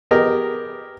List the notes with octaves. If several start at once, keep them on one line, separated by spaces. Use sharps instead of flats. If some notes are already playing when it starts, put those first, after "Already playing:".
B3 G4 G#4 A#4 D#5